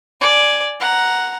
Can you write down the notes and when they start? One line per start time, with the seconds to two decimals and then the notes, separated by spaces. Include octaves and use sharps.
0.21 D5 G#5
0.80 F#5 A#5